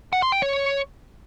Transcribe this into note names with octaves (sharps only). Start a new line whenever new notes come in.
F#5
C6
G5
C#5